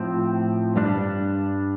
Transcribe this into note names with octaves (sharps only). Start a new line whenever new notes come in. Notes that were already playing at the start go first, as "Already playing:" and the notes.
Already playing: A2 F3 C4
G2 G3 D4